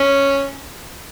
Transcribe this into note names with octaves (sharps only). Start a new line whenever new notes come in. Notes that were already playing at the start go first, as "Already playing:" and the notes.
Already playing: C#4